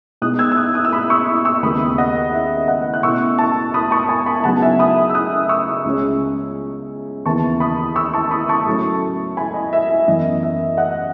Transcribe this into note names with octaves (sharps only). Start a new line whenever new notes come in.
B2 G#3 D#4 D#6 F#6
E6 G#6
E6
D#6 F#6
D#6 F#6
E6
B5 D#6
C#6 E6
C#6 E6
D#2 C#3 G#3 B3 B5 D#6
D#5 F#5
E5
D#5 F#5
F#6
B2 A3 C#4 E4 C#6 E6
A5 C#6
B5 D#6
A5 C#6
G#5 B5
G#5 B5
C#3 F#3 B3 D#4 F#5 A5
E5 G#5
B5 D#6
E6
D#6 F#6
C#6 E6
C#2 C#3 G#3 C#4
D#2 C#3 E3 B3 A5 C#6
B5 D#6
C#6 E6
A5 C#6
B5 D#6
A5 C#6
A2 F#3 A3 C#4
G#5 B5
D#5
E5
E5
F#2 E3 B3 D#5
E5
D#5 F#5